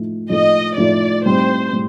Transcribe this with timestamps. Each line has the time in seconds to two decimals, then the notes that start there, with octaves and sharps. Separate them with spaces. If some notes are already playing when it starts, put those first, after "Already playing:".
Already playing: A2 F3 A3 D#4
0.30 A2 F3 A3 D#4 D#5
0.77 A2 F3 A3 D#4 D5
1.25 A2 G3 C4 D#4 C5
1.73 A2 G3